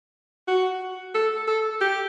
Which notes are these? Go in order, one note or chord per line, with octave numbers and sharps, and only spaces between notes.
F#4
A4
A4
G4